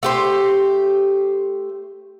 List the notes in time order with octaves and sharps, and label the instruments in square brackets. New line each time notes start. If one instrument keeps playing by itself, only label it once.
[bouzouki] A3 G4 C5